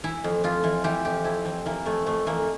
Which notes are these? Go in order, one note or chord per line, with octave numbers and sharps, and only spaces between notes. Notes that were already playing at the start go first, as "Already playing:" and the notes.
E3 E4
F2
F2 F4
E3
E3 G4
F2 G4
F2 E4
E3 C4
E3 A#3
F2 A3
F2 A3
E3 A#3